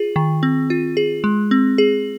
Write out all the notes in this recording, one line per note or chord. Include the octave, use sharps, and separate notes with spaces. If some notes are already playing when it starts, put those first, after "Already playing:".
Already playing: F4 G#4
D#3
C4
F4
G#4
G#3
C4
G#4